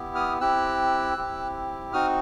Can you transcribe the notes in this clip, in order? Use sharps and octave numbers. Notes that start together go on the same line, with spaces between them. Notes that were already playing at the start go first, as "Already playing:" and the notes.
Already playing: B3 E4 G4
D#6 F6
C4 E4 G4 E6 F#6
C4 E4 G4
C4 D#4 F#4 D#6 F6